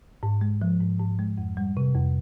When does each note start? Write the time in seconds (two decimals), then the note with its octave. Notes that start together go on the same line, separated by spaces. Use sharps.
0.23 G#2
0.41 G#3
0.62 F3
0.81 G#2
0.99 G#2
1.19 G#3
1.38 F2
1.57 G3
1.77 C3
1.95 F2